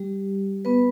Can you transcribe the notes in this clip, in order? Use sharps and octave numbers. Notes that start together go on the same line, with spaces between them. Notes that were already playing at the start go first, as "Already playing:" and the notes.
Already playing: G3 G4
B3 B4